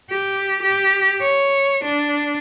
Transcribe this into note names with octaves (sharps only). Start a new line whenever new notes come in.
G4
G4
C#5
D4